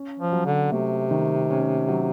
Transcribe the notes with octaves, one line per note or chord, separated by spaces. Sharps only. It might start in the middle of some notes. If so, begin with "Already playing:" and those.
Already playing: C#4
F3
F#3
D3
C3 A3
D#3
C#4
F#3